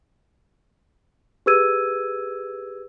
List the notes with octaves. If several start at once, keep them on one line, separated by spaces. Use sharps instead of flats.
G4 G#4 B4 E6 G#6 D#7